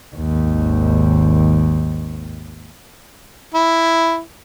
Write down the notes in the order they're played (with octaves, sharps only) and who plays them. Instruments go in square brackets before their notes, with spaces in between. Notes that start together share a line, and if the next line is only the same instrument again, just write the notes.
[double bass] G#1 D#2
[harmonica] E4